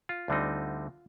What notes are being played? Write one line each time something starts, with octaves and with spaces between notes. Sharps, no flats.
F4
D2 D3 G3 C4 D#4